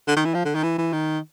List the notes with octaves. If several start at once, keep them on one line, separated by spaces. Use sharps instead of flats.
D3
D#3
E3
F3
D3
D#3
E3
E3
D#3